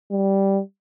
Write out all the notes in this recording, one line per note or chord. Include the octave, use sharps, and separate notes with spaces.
G3